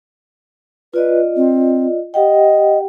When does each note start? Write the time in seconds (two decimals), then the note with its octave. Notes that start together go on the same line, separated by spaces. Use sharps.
0.94 F4 B4 D5 D#5
1.36 C4
2.14 G4 D#5 F#5 G5